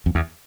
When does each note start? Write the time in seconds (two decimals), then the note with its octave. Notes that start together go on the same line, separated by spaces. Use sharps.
0.06 F2
0.15 E2